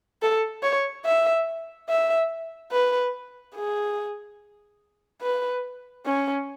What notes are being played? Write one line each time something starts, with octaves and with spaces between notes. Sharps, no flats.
A4
C#5
E5
E5
B4
G#4
B4
C#4